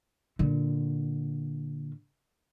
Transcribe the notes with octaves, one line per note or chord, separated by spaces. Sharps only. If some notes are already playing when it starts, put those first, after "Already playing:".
A#2 D3